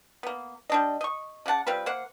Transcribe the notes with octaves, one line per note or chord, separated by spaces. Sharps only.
A#3 B3
G3 D4 D#5
D#5 C#6
C#3 D5 F#5 A5
G3 C4 F4 B4
A#3 C5 F#5